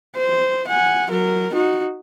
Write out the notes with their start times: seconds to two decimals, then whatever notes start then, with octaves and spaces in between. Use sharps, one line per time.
0.16 C5
0.67 F#5 G#5
1.10 F#3 A#4
1.53 D#4 F#4